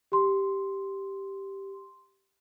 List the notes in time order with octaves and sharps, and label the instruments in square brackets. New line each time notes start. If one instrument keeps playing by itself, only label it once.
[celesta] G4 C6